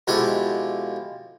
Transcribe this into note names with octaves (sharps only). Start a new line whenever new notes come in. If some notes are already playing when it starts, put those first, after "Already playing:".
B2 F3 G#3 E4 G4 A4